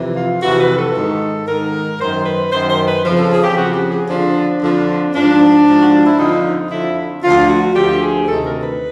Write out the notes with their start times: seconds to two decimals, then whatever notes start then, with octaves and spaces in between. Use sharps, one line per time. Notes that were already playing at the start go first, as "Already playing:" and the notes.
Already playing: F2 C3 E3
0.16 F4
0.43 F2 C3 E3 F#4
0.60 B4
0.78 A4
0.96 G#2 D#3
1.48 G#2 D#3 A#4
2.00 F#2 D#3 C5
2.26 B4
2.52 F#2 D#3 C5
2.70 C5
2.87 B4
3.05 F2 C#3 F3
3.18 A4
3.31 G#4
3.44 G4
3.57 F2 C#3 F3 F#4
3.74 G4
3.91 G#4
4.09 F2 D3 F3 D4
4.62 F2 D3 F3
5.14 G#2 F3 D4
5.67 G#2 F3
5.81 F#4
5.94 F4
6.06 E4
6.19 F2 D3 F3 D#4
6.45 D#4
6.71 F2 D3 F3 E4
7.23 D2 D3 F3 F4
7.50 F#4
7.75 D2 D3 F3 G4
8.02 G#4
8.28 D2 C3 D#3 A4
8.46 A#4
8.63 B4